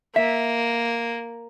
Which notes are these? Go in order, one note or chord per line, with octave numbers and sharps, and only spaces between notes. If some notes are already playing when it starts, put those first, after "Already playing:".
A#3 E5